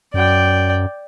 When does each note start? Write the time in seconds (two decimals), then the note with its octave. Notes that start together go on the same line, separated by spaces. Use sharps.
0.14 F#2 D5 G5